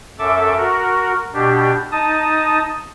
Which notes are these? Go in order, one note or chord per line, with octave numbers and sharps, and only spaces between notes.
F#2 A4 E5 D6
F#4 A#4
B2 D4 G4
D#4 A5 D#6